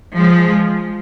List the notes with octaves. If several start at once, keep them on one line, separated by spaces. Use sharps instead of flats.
F3 G#3